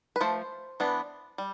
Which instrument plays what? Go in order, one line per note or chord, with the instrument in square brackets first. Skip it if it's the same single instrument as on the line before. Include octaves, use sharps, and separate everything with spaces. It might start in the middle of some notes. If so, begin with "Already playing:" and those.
[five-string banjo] B4
F3 A3 C5
E3 B3 D4
G3